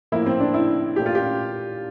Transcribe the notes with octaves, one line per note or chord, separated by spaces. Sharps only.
A2 F3 A#3 E4
C4
D4
E4
A#2 A3 G4
F4
G4